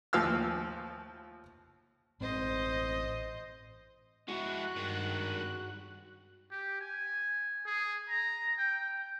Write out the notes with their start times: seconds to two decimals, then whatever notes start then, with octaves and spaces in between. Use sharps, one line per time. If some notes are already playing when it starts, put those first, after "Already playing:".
0.13 D#2 A2 F3 F5 E6 F6
2.20 A1 C4 C5 D#5
4.28 G#3 E4 F#4 F#6
4.77 G2 D#3 G#3
6.51 G4
6.81 G#5
7.66 G#4
8.09 A#5
8.58 G5